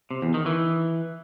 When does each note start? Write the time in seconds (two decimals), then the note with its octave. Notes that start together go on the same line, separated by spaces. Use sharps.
0.11 C3
0.22 E2
0.34 D#3
0.46 E3